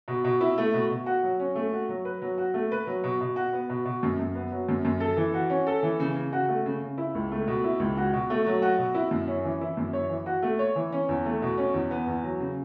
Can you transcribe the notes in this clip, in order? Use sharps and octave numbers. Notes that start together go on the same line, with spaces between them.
B2
B2
E4
A3
B2
B2
F#4
F#3
C#4
A3
F#4
F#3
B4
F#3
F#4
A3
B4
F#3
B2
B2
F#4
B3
B2
B2
F#2
F#2
B3
F#3
F#2
F#2
A4
E3
F#4
C#4
A4
E3
C#3
C#3
F#4
A3
C#3
C#3
E4
C#2
A3
B2
E4
C#2
F#4
B2
A3
F#3
F#4
B2
E4
F#2
C#4
E3
E4
F#2
C#5
E3
F#4
A3
C#5
E3
C#4
E2
A3
B2
C#4
E2
B3
E2
F#3
C#3